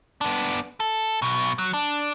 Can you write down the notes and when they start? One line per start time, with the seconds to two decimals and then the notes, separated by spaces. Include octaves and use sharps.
0.21 B3 D4
0.80 A4
1.22 B1 B2
1.58 F#3
1.74 D4